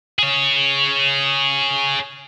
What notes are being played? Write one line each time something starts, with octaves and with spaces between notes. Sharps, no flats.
G#4 C#5